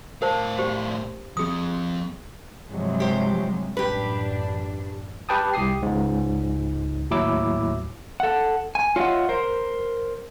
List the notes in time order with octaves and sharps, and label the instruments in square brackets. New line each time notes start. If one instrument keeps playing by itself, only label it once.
[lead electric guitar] A2 F5 [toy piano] A#4 C5 A5
[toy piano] G4 C5
[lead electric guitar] F3 C4 [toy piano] G#4 D#6
[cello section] G2 C3 F#3 [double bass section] F3 G#3
[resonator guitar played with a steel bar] G4 C5
[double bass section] A1 F#2 [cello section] D4 [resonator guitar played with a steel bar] G4 B4
[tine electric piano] G4 B4 G5 A5 D#6
C2 G4 D#6 C7
C#2 G#2
D#2 A2 F#3 E4 D6 E6
[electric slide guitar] A4 F#5
G#5
F4 C#5 D#5 E5 F#5
A#4 C5